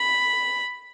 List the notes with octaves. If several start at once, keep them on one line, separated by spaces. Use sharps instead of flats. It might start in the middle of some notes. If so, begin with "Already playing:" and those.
Already playing: B5